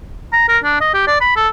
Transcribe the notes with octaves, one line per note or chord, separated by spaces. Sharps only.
A#5
A#4
D4
D#5
G4
D5
B5
A4